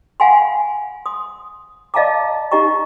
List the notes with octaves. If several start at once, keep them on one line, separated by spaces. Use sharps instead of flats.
F5 F#5 G#5 B5 C6
C6 D#6
D5 D#5 F5 A5 A#5 D6
D#4 G4 D#5 A#5 C#6